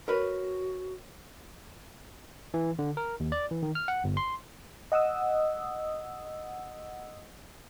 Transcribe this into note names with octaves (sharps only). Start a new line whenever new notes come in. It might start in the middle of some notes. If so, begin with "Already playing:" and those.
F#4 A#4 B4 C#5
E3
D3
A#4
D#2
D5
E3
D#3
F6
F#5
G1
C6
D#5 F#5 D#6 E6